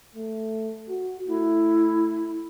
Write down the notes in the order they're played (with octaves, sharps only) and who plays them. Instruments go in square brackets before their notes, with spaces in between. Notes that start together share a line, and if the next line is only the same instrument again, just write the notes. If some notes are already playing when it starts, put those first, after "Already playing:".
[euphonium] A3
F#4
[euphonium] A3 [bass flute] E4